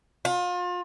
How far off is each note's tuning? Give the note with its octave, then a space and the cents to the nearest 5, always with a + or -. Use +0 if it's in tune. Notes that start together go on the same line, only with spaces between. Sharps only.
F4 +35